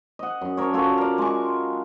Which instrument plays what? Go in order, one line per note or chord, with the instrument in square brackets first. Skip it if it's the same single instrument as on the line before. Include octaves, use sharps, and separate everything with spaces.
[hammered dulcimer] D#5 F#5
F#2
D4 A#4 C#5
F4 F#4 A4 C#5
A#4 D5
G#3 C#6